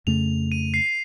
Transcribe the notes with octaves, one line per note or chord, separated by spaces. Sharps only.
F2 C#3 A3 F7
D#7
C7